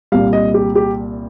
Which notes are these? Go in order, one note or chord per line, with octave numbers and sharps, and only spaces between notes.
C2 A#2 G3 F5
D#5
G4
G4